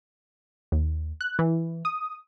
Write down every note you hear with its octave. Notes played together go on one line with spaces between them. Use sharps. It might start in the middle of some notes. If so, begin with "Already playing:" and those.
D#2
F#6
E3
D#6